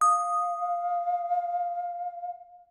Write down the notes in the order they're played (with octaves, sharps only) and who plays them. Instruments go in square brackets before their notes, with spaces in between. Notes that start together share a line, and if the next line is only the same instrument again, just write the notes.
[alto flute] F5 [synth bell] D#6